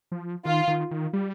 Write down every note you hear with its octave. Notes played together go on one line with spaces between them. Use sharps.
F3
D#3 F4
D#3
D#3
G3